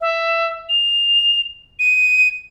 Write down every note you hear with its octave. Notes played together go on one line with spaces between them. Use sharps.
E5
F7
D#7